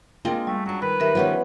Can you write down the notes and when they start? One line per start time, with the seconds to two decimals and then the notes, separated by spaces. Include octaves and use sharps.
0.25 G#3 A#3 C4 D4 F4 D#5
0.47 G3 A3
0.66 F#3 C#4 D4
0.82 D#3 B4
1.00 D#3 G3 A#4 E5
1.15 D#3 F3 G3 B3 C#4